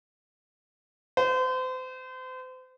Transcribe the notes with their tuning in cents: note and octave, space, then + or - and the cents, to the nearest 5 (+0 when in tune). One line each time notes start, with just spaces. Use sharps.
C5 -35